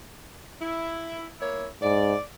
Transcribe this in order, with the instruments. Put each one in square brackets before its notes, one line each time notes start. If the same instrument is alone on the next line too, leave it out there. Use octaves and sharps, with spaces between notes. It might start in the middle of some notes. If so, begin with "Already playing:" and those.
[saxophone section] E4
A#3 E4 C#5
[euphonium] G#2 [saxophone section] D5